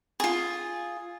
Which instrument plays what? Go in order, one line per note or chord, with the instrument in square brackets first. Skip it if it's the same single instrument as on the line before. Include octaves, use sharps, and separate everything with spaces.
[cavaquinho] F4 G#4